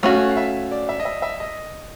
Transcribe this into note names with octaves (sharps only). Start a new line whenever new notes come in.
A3 C#4 F#4 F5
F5
E5
D5
E5
D#5
E5
E5
D#5